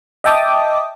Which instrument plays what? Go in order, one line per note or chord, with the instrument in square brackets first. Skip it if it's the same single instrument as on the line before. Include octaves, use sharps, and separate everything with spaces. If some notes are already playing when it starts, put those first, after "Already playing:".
[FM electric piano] D#5 E5 G5 A5 D6 D#6